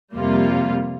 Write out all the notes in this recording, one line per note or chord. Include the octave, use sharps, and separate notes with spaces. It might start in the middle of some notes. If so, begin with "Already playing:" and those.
F2 C3 G3 A#3 F4